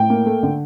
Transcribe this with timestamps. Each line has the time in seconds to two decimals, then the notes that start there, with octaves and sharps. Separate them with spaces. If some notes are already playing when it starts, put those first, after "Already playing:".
Already playing: A2 G5
0.10 A#3
0.26 A3
0.43 D3